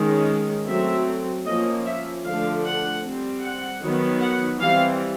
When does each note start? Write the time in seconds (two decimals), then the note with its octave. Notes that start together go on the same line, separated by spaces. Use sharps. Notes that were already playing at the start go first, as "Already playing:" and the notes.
Already playing: D#3 G#3 C#4
0.68 F#3 A3 C4 E5
1.46 F3 A#3 C#4 D#5
1.86 E5
2.25 D3 F3 A3 D4 F5
2.65 F#5
3.03 G3 C4
3.43 F#5
3.82 D#3 F#3 B3
4.22 F#5
4.60 E3 G3 C4 F5